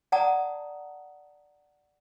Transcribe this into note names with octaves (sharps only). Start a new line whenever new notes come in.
D5 F#5 A5 A#5 D#6